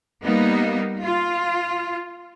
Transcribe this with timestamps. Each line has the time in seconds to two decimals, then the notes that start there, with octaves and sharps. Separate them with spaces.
0.23 G3 A#3 B3 D#4
1.02 F4